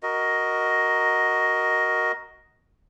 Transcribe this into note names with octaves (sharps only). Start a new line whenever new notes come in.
F#4 A#4 D#5